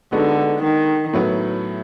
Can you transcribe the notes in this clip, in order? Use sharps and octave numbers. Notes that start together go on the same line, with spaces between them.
D3 G#3 B3 D#4 F#4 A4
D#3
A2 F#3 B3